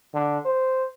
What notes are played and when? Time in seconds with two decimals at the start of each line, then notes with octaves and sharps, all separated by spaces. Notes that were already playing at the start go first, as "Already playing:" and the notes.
0.14 D3
0.45 C5